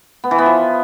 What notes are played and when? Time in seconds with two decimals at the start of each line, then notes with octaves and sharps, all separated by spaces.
0.24 B3
0.31 E3
0.38 B3
0.46 F3